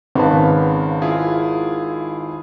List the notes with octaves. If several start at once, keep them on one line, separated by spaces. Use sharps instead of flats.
G#1 C#3 B4 F5 A5
E4 F4 G#4